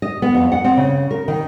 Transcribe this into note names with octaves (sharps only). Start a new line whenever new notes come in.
D#5
B3
F2
F#5
C4
C#3
A#4
D#3